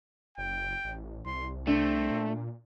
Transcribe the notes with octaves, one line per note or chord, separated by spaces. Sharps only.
F#1 G5
A1
C2 C6
A3 C4 D4
A#2